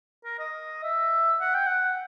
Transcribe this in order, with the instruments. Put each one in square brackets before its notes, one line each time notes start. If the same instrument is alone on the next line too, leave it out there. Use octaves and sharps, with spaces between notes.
[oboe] A#4
D#5
E5
F#5
G5
F#5